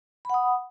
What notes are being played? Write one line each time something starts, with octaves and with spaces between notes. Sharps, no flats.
F#5 B5 D#6